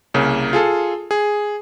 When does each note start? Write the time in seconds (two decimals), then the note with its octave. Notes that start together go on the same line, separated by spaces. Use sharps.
0.14 C2 C#3 A#3
0.53 F4 G#4 A4
1.11 G#4